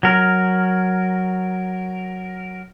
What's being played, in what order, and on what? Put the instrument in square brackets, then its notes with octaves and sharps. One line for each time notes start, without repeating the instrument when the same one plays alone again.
[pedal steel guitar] F#3 A#4